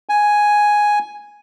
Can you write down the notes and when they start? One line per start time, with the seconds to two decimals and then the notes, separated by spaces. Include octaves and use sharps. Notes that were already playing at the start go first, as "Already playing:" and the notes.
0.09 G#5